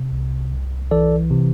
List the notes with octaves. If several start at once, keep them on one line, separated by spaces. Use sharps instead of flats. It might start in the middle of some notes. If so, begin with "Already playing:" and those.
Already playing: C3
C2
C2
E3 A4 D5
C3